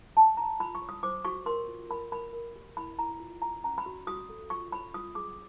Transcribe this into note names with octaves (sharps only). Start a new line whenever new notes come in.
D4 A5
D4 A#5
F4 B5
C#6
C#5
D#6
C5 D6
F#4 C#6
A#4 C6
F4
A#4 B5
A#4 B5
A#4
G4
E4 B5
E4 A#5
F4
D4 A#5
C#4 A#5
B5
F#4
F#4 D#6
A4
F4 C#6
C#5 B5
F4 D#6
G#4 D6